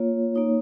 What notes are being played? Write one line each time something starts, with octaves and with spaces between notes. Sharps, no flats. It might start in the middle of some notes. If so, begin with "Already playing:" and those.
Already playing: A#3 F4 C#5
A#3 D#4 C#5